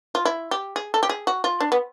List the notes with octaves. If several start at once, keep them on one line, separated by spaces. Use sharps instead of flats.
F4
E4
G4
G#4
A4
G4
G#4
F#4
F4
D4
B3